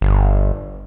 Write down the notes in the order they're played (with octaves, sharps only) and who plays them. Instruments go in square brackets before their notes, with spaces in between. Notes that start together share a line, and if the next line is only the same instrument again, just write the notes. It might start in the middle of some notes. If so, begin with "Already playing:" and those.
[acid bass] G1